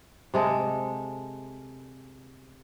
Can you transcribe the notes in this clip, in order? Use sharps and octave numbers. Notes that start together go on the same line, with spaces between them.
C3 G#3 A4